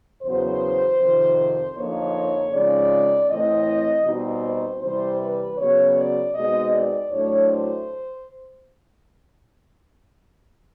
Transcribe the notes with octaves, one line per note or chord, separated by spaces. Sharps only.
E2 C#3 F#3 B3 C5
F2 C3 D#3
F2 D3 F3 A#3 D#4 C#5
C#3 F3 G#3 C4 D#4 D5
A2 E3 A3 C4 D#5
B2 G3 C4 D#4
C5
C3 E3 G3 C5
B4
C#3 F#3 B3 C#5
D5
B2 G#3 C4 D#4 D#5
D5
A2 F#3 A3 D4 C#5
C5